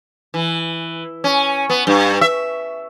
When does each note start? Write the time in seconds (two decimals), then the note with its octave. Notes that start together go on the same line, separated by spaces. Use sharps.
0.34 E3
1.24 C#4
1.70 B3
1.87 G2
2.21 E5